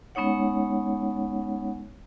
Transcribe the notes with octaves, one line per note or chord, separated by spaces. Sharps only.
G#3 B3 C#4 D#4 C#5 F#5